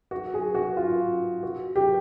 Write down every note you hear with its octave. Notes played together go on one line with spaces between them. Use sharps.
F#4
G#4
F#4
F4
F#4
G4